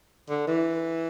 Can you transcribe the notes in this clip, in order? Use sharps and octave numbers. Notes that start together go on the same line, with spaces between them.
D3
E3